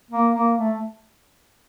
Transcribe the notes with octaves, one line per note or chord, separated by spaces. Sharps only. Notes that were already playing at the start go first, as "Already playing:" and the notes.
A#3
A#3
A3